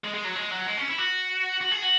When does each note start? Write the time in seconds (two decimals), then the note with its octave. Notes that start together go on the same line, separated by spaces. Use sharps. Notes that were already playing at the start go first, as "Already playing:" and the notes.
0.04 G#3
0.14 G#3
0.24 F#3
0.35 G#3
0.51 F#3
0.67 G#3
0.78 C#4
0.88 E4
0.98 F#4
1.61 F#4
1.71 G#4
1.82 F#4